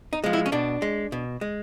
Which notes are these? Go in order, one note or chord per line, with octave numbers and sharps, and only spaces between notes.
D#4
F3 G#3
E4
C#4
B2 D4
G#3
B2
G#3